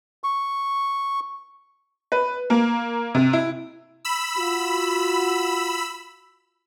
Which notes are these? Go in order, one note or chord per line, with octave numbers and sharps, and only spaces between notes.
C#6
B4
A#3
C3
E4
B5 E6
F4 F#4